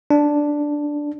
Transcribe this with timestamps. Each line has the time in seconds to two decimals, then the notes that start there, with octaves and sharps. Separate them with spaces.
0.11 D4